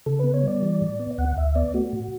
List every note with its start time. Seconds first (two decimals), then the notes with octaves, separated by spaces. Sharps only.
0.06 C#3 A4
0.19 B3 B4
0.34 C#5
0.43 G3 D5
0.62 E3
0.81 A2
0.99 B3
1.18 D2 F#5
1.37 D2 E5
1.55 B3 D5
1.74 A3 F#4
1.93 A2